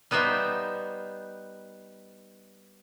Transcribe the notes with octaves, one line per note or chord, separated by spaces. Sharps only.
G3 B3 D#4 C5 E5